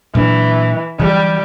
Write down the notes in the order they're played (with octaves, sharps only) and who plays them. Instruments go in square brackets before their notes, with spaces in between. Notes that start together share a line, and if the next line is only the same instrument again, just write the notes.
[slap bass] A#2 F#3 D4 [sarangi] E3
[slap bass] D3 E3 F#3 [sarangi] G3